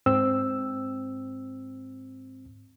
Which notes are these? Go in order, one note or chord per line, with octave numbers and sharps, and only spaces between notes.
G#2 C4 E6